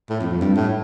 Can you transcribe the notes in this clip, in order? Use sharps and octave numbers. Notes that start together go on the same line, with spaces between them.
A2
F2
F2
G2
A2